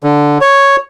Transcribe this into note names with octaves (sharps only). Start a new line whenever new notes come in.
D3
C#5